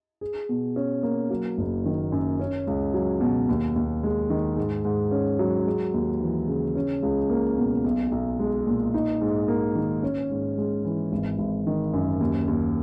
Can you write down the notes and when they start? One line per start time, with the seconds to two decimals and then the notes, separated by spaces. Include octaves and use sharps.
0.21 G#4
0.49 B2
0.76 C#4
1.03 A#3
1.30 F#3
1.58 F#1
1.85 D#3
2.12 F#2
2.39 C#4
2.67 C#2
2.94 F#3
3.21 B2
3.49 D#2
3.76 D#2
4.03 G#3
4.30 D#3
4.57 G#2
4.85 G#2
5.11 C#4
5.39 F#3
5.66 G#3
5.94 D#2
6.20 E3
6.48 C#3
6.76 C#4
7.03 C#2
7.30 A#3
7.57 B2
7.84 B1
8.12 B1
8.39 G#3
8.67 A#2
8.94 D#4
9.21 G#2
9.48 A#3
9.75 D#3
10.03 C#4
10.30 G#2
10.58 G#3
10.85 E3
11.12 G#1
11.39 G#1
11.67 D#3
11.93 F#2
12.21 D#2
12.48 D#2